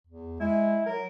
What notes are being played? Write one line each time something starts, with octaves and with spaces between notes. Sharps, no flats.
E2
G#3 E4
F#3 A#4